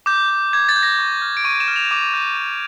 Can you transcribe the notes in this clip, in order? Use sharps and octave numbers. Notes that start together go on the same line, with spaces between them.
D6 G6
G6
D6 G#6
A6
G6
A#6
C#6
F6
D7
C#6 D#7
E7
F6
F7
D6
G6
D6